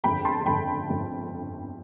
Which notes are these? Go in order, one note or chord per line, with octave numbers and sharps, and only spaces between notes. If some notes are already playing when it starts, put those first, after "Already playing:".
G1 F2 D3 G5 B5
A5 C6
A5
G1 F2 D3 G5 B5
G1 F2 D3